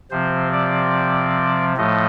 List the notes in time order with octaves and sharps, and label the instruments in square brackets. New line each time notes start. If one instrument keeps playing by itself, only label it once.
[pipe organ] C3 F3 C4 C5
D5
A2 F3 A3 D#5